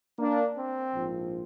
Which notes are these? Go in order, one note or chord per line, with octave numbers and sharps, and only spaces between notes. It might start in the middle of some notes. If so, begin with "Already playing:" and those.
A#3 D4
C4
A#1 G#2 F3